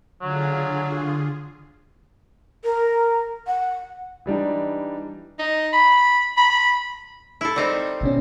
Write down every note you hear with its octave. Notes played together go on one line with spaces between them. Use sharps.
D3 F#3 F4 G#4
A#4
F#5
E3 G3 D4 D#4
D#4
B5
B5
B5
E4 A4
G3 C4 D#4
G#1 B2 C#4